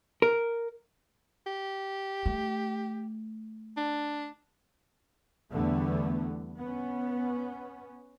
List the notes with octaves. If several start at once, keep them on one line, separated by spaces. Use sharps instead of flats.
A#4
G4
A3
D4
E2 D3 E3 G3 A3 B3
B3 C#4